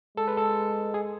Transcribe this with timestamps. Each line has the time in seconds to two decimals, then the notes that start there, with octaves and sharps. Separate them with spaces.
0.17 G#3 A4
0.28 B4
0.37 A4
0.94 G#4